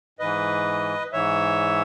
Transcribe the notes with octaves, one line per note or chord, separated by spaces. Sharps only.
G#2 E3 B4 D#5
G#2 E3 C#5 E5